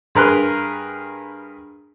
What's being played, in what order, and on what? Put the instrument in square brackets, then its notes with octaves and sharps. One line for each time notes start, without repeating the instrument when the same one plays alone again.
[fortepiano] G2 G#4 A#4 B4 C6 F#6